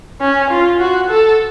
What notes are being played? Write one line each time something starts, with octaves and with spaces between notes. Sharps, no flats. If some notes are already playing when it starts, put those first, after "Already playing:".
C#4
F4
F#4
A4